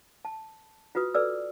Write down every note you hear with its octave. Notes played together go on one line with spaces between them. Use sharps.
A5
F4 F#4 B4 D#6
A4 B4 D5 E6